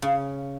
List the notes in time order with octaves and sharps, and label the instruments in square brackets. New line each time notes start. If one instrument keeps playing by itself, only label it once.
[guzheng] C#3